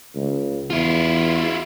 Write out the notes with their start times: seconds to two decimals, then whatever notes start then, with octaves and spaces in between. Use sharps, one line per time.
0.16 C#2
0.70 E2 E4 F4